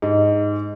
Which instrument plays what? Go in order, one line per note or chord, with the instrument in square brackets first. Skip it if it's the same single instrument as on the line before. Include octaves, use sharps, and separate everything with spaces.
[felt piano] G#2